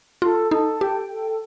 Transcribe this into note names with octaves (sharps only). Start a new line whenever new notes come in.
F4 A4
D#4 A4
G4 G5
A4